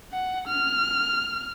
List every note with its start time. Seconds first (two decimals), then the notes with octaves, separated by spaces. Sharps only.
0.12 F#5
0.48 F6